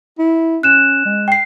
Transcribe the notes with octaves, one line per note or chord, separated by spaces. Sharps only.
E4
C#4 F#6 E7
G#3
G5 C7